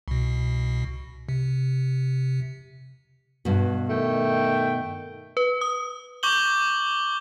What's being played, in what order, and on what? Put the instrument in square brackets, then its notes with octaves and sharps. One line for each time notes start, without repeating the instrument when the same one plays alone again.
[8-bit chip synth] C2 B2
C3
[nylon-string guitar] G2 B2
[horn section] D#3 A3 G5
[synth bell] B4
D#6
[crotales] C#6 D6 G6 F#7 G7